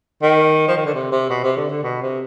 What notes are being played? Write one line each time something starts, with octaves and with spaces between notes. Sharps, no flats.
D#3
F3
D#3
D3
C3
C3
B2
C3
D3
D3
B2
C3